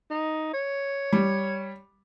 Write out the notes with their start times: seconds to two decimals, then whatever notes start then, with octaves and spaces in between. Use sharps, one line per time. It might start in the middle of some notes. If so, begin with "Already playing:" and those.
0.10 D#4
0.53 C#5
1.12 G3